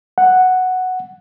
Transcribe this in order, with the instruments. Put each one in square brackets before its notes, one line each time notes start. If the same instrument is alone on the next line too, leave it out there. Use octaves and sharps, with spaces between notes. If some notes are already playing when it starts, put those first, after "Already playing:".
[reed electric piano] F#5